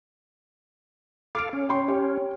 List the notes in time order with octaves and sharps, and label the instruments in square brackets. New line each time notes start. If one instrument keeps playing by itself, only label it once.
[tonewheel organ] A4 F5 [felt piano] D6 F6 D7
[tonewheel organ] C#4
[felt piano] G5 C6 C#6
G4 C#5